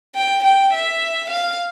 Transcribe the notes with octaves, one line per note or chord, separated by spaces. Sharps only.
G5
G5
E5
F5